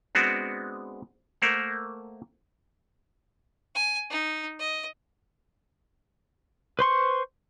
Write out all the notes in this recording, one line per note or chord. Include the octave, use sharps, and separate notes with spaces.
G#3 B3 C4 D4 F#4
A3 A#3 A#4 C5 F#5
G#5
D#4
D#5
B4 C5 C6 C#6